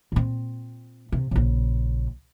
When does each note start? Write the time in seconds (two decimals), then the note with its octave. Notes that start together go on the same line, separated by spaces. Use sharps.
0.12 A#2 C4
1.12 C3
1.31 A#1 C#3